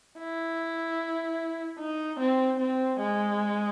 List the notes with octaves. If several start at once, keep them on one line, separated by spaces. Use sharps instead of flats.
E4
D#4
C4
C4
G#3